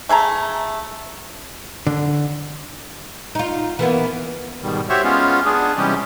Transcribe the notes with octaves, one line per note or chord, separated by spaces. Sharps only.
A3 G#4 A4 A#5
D3
D#4 F4
E3 A#3 B3
G#2 B2 D#3 G3
F#4 G4 C5 C#5 E5
G#3 B3 C#4 F4
B3 D4 G#4
C3 E3 G3 G#3 C#4 G4